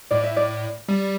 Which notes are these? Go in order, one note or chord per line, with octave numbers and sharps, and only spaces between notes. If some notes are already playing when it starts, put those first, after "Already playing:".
A2 D5
E5
D5
G3